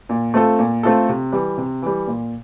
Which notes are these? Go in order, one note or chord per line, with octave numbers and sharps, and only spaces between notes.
A#2
A3 C4 F4 A4
A#2
A3 C4 F4 A4
C3
E3 G3
C3
E3 G3
A#2